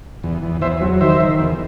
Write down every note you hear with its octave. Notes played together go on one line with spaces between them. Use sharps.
E2
E2
E2 C5 E5
F#3
D#3 C5 E5
D#3
E2